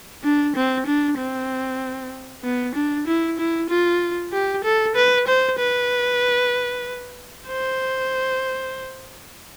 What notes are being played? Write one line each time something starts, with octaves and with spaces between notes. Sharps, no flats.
D4
C4
D4
C4
B3
D4
E4
E4
F4
G4
A4
B4
C5
B4
C5